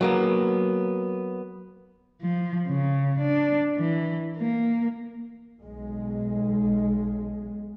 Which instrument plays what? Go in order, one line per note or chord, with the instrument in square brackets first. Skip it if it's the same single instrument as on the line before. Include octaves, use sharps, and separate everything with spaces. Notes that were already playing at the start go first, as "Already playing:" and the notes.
[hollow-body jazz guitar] F#3 A#3 B3
[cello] F3
C#3
D4
E3
A#3
[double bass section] B1 G#3